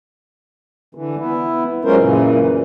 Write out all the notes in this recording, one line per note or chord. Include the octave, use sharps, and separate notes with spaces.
D3 E3
B3 E4
F#3 G#3 C#4 F4 A#4 C5
F#2 A#2 C#3 E3